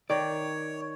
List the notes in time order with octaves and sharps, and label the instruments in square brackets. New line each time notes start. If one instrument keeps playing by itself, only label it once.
[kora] D#3 [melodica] C#5 [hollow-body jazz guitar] D5